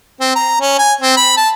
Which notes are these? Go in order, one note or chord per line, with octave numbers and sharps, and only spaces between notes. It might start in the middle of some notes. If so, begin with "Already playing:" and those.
C4
A#5
C#4
G#5
C4
B5
A5